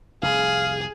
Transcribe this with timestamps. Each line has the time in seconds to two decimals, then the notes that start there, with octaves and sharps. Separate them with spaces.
0.23 F1 C2 G#4 F5